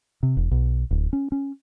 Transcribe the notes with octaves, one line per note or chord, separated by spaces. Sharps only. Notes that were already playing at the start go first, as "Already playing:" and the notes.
C3
E1
B1
D1
C#4
C#4